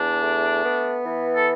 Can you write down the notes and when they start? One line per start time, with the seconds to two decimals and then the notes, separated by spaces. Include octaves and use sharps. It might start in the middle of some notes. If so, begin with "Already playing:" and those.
Already playing: E2 D4
0.21 A3
0.63 B3
1.05 E3
1.35 A4